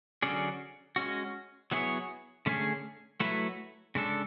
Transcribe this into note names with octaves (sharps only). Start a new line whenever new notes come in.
D3 F#3 C#4 G#4 D5
G#3 C#4 F#4
F#3 B3 E4 G#4 C#5
D3 A3 C#4 G#4
F#3 A3 E4 B4
C#3 G#3 D4 A4